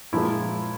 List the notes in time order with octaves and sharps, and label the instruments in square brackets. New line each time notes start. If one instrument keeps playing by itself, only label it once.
[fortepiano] A#2 F3 G#3 E4